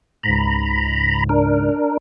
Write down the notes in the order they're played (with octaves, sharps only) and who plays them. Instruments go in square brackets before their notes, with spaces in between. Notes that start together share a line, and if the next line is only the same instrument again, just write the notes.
[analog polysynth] C#2 G#2 [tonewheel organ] A#5 B5
[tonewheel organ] D4 A#4